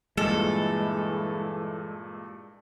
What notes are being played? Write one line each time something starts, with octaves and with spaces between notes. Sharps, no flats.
G2 A#2 E3 G#3 A4